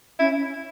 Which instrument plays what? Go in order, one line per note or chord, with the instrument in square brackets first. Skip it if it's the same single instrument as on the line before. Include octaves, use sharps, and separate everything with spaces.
[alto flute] C#4 [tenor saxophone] E4